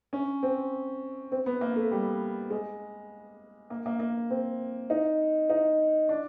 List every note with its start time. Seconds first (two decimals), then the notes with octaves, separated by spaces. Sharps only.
0.13 C#4
0.43 C4
1.32 C4
1.46 B3
1.61 A#3
1.76 A3
1.91 G3
2.50 G#3
3.70 A#3
3.86 A#3
4.00 A#3
4.30 C4
4.90 D#4
5.50 D#4
6.09 D4